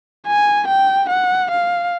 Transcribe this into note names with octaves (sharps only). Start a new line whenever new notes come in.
G#5
G5
F#5
F5